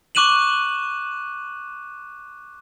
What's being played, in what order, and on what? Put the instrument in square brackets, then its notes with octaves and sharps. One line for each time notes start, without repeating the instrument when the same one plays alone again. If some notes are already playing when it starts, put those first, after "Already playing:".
[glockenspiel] C#6 D6 F#6 D#7 E7 F#7